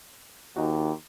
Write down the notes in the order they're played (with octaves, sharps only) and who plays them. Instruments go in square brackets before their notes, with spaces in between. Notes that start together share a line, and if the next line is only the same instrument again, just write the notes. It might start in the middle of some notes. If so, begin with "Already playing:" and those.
[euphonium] D#2 [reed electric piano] D#4 F#4